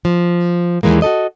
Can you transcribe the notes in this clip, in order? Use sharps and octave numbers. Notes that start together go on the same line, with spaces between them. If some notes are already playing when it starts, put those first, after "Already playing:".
F3
D#2 A#2 E3 G#3 A#3
F#4 G4 A4 D#5